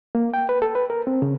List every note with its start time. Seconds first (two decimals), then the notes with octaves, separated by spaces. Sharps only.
0.15 A#3
0.34 G5
0.49 B4
0.62 A4
0.75 B4
0.90 A#4
1.07 C4
1.22 C#3